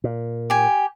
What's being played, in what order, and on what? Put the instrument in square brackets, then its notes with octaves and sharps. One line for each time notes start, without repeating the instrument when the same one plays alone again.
[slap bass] A#2
[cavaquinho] G4 G#5